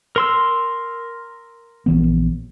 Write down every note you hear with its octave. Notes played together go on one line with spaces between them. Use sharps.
A#4 C6 E6
A#1 E3 B3